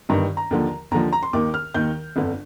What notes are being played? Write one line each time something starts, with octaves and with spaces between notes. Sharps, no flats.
G1 G2 D#3 A#5
A#5
D#2 D3 F3
D#2 D3 F3 A#5
A#5
C6
D#2 D#3 D6
F6
D#2 D#3 G6
G1 F2 D3